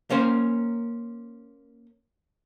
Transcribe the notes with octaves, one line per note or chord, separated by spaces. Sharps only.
A#3 C#4 C5